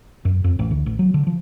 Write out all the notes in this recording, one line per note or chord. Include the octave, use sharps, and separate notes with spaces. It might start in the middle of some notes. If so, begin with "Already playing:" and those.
F#2
F2
A1
D2
A1
F#3
D3
F3